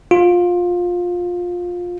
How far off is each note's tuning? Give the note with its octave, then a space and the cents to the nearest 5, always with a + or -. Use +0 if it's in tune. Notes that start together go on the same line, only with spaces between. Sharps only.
F4 +20